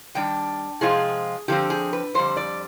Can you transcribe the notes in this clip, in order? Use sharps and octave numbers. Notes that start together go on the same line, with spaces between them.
D#3 G3 D4 G5
C3 F3 G#3 C4 F4 G#4
D3 F3 C4 G4
G#4
B4
F2 D3 G3 C5
D5